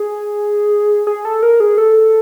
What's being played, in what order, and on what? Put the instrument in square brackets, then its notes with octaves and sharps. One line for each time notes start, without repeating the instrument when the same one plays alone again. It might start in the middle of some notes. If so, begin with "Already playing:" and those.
Already playing: [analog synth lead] G#4
G#4
A4
A#4
G#4
A4